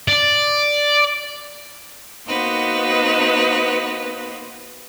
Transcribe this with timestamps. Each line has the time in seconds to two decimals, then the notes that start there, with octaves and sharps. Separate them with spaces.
0.08 D5
2.28 A#3 B3 D#4 F#4 B4 C5